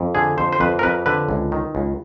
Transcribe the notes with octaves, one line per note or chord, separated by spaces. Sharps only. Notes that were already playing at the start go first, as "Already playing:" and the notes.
Already playing: F2
D3 G#4
F2 C5
C5
F2 B4
A#4
F2 B4
D3 B4
C#2
D#3
C#2